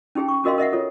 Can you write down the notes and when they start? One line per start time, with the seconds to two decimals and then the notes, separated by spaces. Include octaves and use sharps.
0.15 C#4 D#4 G4 G#4 G5
0.28 C#6
0.44 C#4 F#4 A#4 D#5 F5 C6
0.58 A#4 D#5 E5 F#5
0.72 F4 A4 C#5